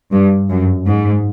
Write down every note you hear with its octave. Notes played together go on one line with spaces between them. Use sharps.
G2
F#2
G#2